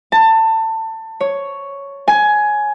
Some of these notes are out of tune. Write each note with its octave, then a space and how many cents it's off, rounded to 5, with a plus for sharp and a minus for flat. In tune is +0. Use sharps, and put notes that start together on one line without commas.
A5 +25
C#5 +5
G#5 +15